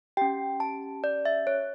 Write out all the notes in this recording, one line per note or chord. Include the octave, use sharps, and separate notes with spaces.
C#4 G4 G5
A5
D5
E5
C#5